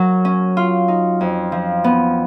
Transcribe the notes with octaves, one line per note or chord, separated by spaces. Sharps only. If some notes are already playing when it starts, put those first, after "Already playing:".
Already playing: F#3 A#4
C#4
F4
D#4
F2
F3
B3